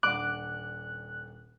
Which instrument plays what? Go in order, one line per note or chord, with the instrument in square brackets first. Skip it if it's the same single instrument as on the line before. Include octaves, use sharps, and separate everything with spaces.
[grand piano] D#1 D4 F#5 [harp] D6 [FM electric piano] F#6